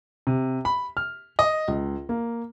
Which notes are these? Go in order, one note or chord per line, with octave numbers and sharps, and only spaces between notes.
C3
B5
F6
D#5
C#2
A#3